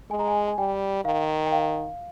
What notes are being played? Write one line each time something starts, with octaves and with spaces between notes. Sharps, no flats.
G#3 G#5
A#5
G#5
G#5
G3 G5
D#3 F5
G5
F5